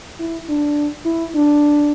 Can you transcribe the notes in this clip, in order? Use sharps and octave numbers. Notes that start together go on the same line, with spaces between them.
E4
D4
E4
D4